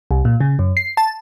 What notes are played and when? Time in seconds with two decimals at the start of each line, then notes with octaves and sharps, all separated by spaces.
0.11 C2
0.25 A#2
0.40 C#3
0.59 F#2
0.77 C7
0.97 A5